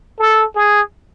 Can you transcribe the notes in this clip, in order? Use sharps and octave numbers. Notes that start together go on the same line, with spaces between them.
A4
G#4